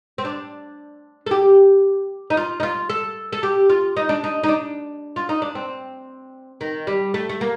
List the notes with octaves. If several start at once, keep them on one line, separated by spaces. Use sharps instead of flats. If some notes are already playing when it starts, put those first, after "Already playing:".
C4
D4
A4
G4
D#4
F4
D#4
F4
A4
A4
G4
F4
D#4
D4
D#4
D#4
D4
F4
D#4
D4
C4
D#3
G3
A3
A3
A#3